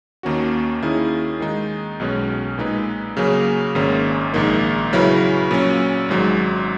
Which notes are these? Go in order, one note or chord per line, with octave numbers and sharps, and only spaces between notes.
D#2 D#3 A#3 C#4 F#4
D#3 A#3 C#4 E4 G#4
D#3 G#3 D#4
B1 B2 G#3 C#4
A#2 G#3 D#4 G#4 B4
C#3 F#3 A#3 C#4 G#4
G#1 G#2 D#3 A#3 C#4
A#1 G#2 D#3 A#3
C#3 F#3 C#4 E4 B4
A#2 F#3 C#4
G#1 G#2 F#3